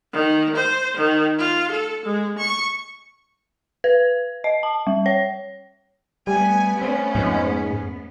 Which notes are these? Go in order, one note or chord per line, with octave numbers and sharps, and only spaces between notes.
D#3
C5
D#3
F4
A4
G#3
C#6
B4
D#5
A5
G3
C#5
G3 A3 B3 G#5
C4 C#4
F2 G#2